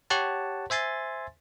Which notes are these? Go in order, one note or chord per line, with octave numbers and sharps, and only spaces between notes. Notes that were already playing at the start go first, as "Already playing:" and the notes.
G4 C#5 F#5 A5
C5 E5 G#5 C6 A6